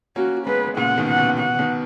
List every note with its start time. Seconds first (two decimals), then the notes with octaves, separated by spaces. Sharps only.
0.16 A#3 C#4 F#4
0.47 G#3 B3 B4
0.77 A#2 C#3 F#5
0.98 B2 D#3
1.08 F#5
1.18 B2
1.39 B2 F#5
1.59 B2 D#3